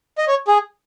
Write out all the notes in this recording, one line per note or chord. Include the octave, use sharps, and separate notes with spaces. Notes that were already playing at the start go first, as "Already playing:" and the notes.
D#5
C#5
G#4